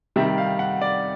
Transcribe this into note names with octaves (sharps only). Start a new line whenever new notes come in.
C3 D#3 G3 E5
F5
F#5
D5